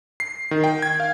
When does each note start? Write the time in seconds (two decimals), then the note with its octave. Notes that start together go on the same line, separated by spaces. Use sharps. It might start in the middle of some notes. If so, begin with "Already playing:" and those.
0.20 C7
0.51 D#3
0.64 G5
0.82 G#6
1.00 F5